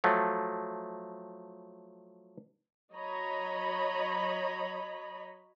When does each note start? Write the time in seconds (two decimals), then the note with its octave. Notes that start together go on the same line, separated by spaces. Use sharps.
0.04 F3 F#3 A3
2.92 F#3 C#5 D#5 A#5 B5